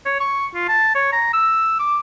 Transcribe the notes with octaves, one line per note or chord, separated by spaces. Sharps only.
C#5
C#6
F4
A5
C#5
A#5
E6
D6